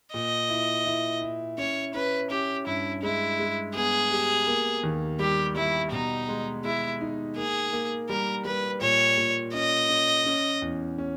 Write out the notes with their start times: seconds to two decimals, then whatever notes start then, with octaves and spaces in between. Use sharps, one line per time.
0.14 A#2 D#5
0.50 E4
0.86 E4
1.22 E4
1.58 C#4 C#5
1.94 C#4 B4
2.30 C#4 G4
2.66 G2 E4
3.03 G#3 E4
3.39 G#3
3.75 B3 G#4
4.11 G4
4.47 A#3
4.83 D#2
5.19 G3 G4
5.56 G3 E4
5.92 B2 D#4
6.28 G#3
6.64 G#3 E4
7.01 D#4
7.37 A#3 G#4
7.73 A#3
8.09 G3 A#4
8.45 G3 B4
8.81 A#2 C#5
9.18 A#2
9.53 C#4 D#5
9.90 C#4
10.26 C#4
10.62 E2
10.98 C#4